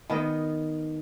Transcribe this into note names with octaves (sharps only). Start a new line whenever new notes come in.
D#3 B3 D#5